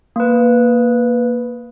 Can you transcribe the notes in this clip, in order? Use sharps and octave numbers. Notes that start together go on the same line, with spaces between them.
A#3 B4